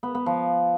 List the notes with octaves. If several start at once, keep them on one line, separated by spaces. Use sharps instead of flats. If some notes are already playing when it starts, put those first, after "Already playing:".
B3
B3
F3